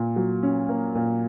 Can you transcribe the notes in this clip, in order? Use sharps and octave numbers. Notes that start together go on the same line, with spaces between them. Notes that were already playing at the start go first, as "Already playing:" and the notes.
Already playing: A#2 A#3
F#3
C#4
A#3
A#2